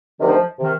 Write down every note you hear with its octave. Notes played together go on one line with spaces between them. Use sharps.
D2 C3 D#3 F3
C3 D#3